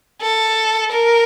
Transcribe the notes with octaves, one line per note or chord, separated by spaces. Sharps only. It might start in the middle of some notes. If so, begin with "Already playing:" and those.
A4
A#4